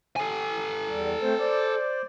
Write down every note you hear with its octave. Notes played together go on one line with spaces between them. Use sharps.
A4 G#5
E2 G3
A3 C4 C5
C5 D5